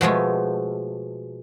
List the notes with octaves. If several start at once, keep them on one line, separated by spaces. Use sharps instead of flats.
B2 F3 G#3 A3